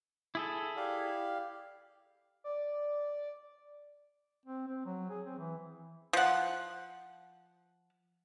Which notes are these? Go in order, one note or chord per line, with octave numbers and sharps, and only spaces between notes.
E4 G#4 A4
G4 D5 F5
D5
C4
C4
F#3
G#4
C4
E3
F3 F#5